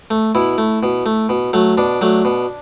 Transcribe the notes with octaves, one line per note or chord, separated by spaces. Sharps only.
A3
B2 E4
A3
B2
A3
B2
F#3 A3
B2 D4
F#3 A3
B2